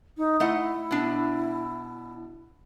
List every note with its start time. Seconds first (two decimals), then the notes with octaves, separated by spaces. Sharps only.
0.17 D#4
0.40 A3 E4 D#5 F#5
0.91 B2 D4